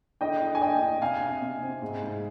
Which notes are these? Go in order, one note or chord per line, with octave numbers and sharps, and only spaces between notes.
D3 D#5 G5
D3
G#5
D4 D#5 G5
D4
C3 F5 G#5
C3
C3
C4
G#2
G#3